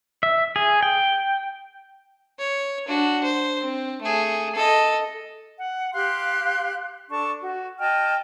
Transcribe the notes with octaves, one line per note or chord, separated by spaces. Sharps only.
E5
G#4
G5
C#5
D4 F#4
C5
C4
A3 G#4
A4 D#5
F#5
G4 F5 C6 F#6
D4 A4 A5 C#6
F#4
D#5 G5 A5 F6